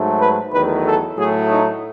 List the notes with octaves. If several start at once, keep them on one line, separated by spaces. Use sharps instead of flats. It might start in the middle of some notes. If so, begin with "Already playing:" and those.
Already playing: G#2 F#3 A3
B4
E2 D#3 F#3 A3 B4
A4
A2 F#3 A3 G#4
D#4